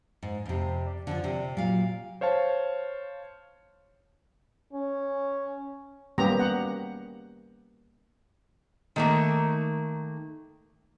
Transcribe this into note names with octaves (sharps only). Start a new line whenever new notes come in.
G#2
F2 C3
D5
D3 E3 F3
C3
A#2 F#3 F5
C5 C#5 F5 A5
C#4
G3 A#3 B3 C#4 G4 A#5
F#5
D#3 A3 A#3